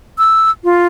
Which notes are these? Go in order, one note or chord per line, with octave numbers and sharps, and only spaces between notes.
E6
F4